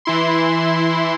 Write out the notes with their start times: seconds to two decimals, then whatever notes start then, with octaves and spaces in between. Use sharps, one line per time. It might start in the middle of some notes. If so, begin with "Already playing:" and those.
0.05 E3 E4 C6